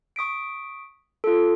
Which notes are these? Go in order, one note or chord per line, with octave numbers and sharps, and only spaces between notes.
C#6 D#6 B6 D7
F4 A4